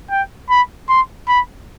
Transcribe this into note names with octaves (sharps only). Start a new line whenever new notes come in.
G5
B5
C6
B5